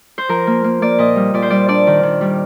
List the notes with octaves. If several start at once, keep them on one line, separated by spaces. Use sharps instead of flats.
C5
F3 A#4
A#3
A#3
A#3 D5
A#2 D#5
G3
A#2 D5
C5
G3 D5
D4 D5
D#3
D#3
G3